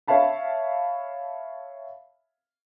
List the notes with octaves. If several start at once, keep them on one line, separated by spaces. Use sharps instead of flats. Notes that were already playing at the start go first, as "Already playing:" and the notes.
C#5 E5 F5 A5 B5